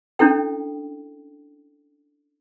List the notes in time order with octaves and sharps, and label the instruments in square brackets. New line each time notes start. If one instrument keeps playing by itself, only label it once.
[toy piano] C#4 D4 E4 A4 G5